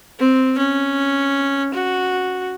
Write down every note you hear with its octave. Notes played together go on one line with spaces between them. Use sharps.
C4
C#4
F#4